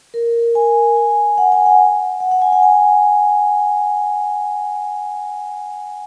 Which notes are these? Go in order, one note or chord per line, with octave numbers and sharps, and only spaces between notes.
A#4
G#5
G#5
F#5
G#5
F#5
F#5
F#5
G#5
F#5
G#5